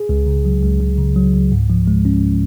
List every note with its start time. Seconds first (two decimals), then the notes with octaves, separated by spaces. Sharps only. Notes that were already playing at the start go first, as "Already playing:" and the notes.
Already playing: G#4
0.09 C#2
0.27 C#3
0.45 F#3
0.63 C#2
0.80 C#2
0.98 C#3
1.16 F#3
1.33 C#2
1.52 G#2
1.70 F3
1.88 G#3
2.05 C#4